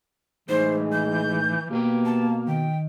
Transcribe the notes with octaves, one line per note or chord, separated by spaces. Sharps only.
A2 E3 G#3 D#4 C5
G6
B2 A#3 G4 B4 G5
A5
D#3 G5